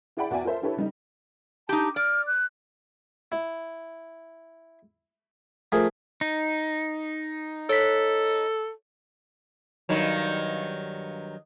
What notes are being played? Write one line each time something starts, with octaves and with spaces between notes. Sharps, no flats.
E4 G#4 D5 F#5 G5 B5
E2 F#4 D5 E5 G5 G#5
F4 A4 A#4 C5 E5
D4 E4 G4 A4 B4 C#5
C#3 G3 D#4
D#4 G4 A5
D5 F6
F#6
E4
F3 A3 G#4 A#4
D#4
A4 C#5 B6
G2 D#3 F#3